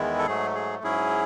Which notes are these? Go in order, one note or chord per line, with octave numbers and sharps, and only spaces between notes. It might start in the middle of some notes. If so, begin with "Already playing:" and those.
Already playing: E2 D#3 G#3 B3 E4
A4
G#2 F#3 A3 G#4
G#4
G#2 F#3 C#4 E4 G#4